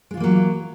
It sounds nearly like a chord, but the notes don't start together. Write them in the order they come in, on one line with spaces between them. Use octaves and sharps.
G#3 F4 E3 A#3 F#3